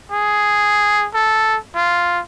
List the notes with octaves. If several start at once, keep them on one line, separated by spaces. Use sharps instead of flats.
G#4
A4
F4